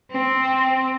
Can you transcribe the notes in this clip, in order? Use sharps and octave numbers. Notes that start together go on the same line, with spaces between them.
C4